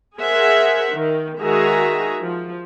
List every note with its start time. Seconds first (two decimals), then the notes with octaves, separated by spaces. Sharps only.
0.18 G#4 A#4 C5 E5 F#5
0.93 D#3
1.41 D#3 G#3 F#4 G#4 E5 A#5
2.21 F3